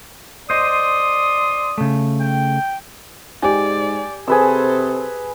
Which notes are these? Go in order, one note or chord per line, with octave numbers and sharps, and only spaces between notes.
C5 D5 D#5 C6 D#6
C#3 A3
G5
G#2 G4 D5 G#5
C3 G#4 A4 B4 C5 E6